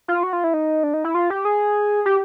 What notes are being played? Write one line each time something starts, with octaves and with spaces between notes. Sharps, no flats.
F4
F#4
F4
E4
D#4
D4
D#4
E4
F4
G4
G#4
G4